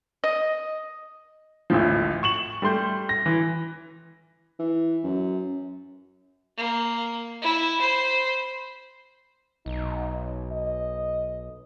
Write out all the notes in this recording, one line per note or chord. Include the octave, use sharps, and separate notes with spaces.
D#5
G#1 D2 A2 F3
C#6 E7 F#7
G3 A3 C6 G6
A#6
E3
E3
F#2
A#3
E4
C5 B5
B1 D#4
D#5